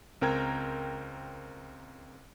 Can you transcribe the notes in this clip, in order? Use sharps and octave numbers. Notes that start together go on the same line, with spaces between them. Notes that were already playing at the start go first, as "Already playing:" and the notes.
C#2 C4 A#4 G5 A#5 G#6